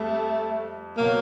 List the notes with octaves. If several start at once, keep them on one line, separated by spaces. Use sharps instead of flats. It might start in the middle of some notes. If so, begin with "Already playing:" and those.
Already playing: F2 G3 A3
B2 F#3 A#3